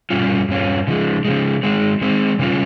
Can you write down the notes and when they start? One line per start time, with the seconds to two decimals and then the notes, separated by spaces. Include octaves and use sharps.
0.10 G2 G3 C#4 F4
0.49 G2 G3 C#4 F4
0.87 C#3 F3 G#3
1.25 C#3 F3 G#3
1.63 D#3 G#3 C4
2.01 D#3 G#3 C4
2.39 C#3 G3 C#4 F4